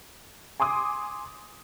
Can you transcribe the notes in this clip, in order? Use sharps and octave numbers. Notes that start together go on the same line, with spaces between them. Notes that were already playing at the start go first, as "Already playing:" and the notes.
G#5 C6 D6 D#6